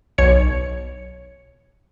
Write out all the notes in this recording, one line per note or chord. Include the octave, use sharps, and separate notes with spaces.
B1 C#5 C#7